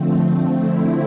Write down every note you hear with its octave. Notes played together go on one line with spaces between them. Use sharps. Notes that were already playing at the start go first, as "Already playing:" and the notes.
Already playing: D3 F3 A3 C4
E4